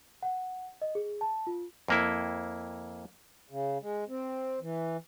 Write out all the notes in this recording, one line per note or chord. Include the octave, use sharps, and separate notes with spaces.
F#5
D#5
G#4
A5
F4
F2 A#3 E4
C#3
G#3
C4
E3